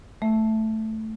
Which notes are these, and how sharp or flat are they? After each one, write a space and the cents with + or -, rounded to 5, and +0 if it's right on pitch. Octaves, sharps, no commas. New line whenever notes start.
A3 +0 E5 +0